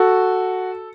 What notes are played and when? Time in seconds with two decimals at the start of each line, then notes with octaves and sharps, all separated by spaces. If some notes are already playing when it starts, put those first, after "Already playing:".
Already playing: F#4 A4